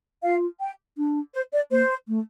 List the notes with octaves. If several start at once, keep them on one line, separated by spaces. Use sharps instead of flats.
F4 F5
G5
D4
C5
D5
A#3 C5
A3